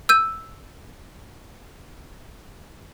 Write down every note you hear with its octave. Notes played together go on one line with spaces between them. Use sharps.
E6 G6 D#7